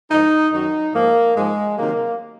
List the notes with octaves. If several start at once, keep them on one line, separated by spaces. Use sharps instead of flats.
G#2 F3 D#4
F#2 D#3 F#3 D#4
G#2 F3 A#3
G#2 F3 G#3
C3 D#3 F#3 A#3